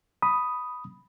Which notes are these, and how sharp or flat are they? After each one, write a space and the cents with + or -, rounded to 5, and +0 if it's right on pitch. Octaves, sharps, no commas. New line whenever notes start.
B5 +0 D#6 +0